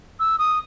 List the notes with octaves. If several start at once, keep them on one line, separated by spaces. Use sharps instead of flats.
E6
D#6